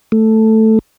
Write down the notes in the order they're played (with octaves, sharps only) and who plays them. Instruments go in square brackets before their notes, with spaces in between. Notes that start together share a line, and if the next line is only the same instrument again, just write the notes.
[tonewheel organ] A3